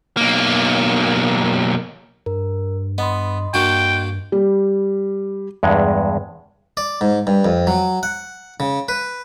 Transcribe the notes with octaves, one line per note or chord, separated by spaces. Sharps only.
B1 A#3
G2 A#4
B3 D#5 B5 C6
G2 A#3 D4 F#4 G5
G3
E2 G2 G#3
D5
G#2
G2
F2
F#3
F#5
C#3
B4